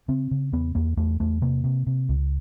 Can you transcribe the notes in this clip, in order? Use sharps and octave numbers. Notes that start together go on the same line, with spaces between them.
C#3 C4
C#3
E2 B3
E2 A#3
E2 A3
E2 A3
C3 A#3
C3
C3
C#2